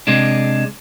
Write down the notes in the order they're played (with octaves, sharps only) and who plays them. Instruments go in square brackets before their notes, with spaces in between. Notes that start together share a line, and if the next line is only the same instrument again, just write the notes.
[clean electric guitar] C3 G#3 D4